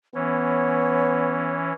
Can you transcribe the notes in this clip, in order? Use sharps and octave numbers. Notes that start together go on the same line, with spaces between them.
E3 B3 C#4 C#5